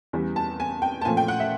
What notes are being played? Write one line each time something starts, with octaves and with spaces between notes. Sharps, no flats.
E2 C#3 E3 G3
A5
G#5
G5
A5
A#2 F3 A3 G#5
G5
F#5
E5